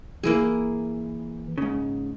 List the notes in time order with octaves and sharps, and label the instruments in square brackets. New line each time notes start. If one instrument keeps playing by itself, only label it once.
[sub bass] E3 [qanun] A#3 E4 G#4
[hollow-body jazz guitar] G#2 C#3